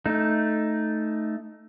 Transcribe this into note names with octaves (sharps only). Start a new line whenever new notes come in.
A3 D#4